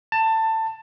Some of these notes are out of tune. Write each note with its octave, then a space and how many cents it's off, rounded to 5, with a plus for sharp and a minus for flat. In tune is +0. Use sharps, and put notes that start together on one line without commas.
A5 +20